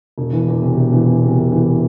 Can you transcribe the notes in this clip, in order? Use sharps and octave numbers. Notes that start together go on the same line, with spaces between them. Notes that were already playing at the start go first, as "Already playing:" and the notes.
E1
E3
E2
C3
E1
E3
E2
C3
E1
E3